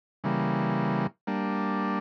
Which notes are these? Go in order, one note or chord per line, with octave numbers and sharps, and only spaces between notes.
C#3 E3 G3 A#3
G3 A#3 D4